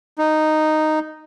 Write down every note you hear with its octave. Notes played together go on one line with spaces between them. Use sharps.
D#4